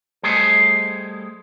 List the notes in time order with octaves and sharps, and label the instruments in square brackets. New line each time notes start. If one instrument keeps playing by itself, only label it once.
[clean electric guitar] G3 A3 G#4 C5 D#5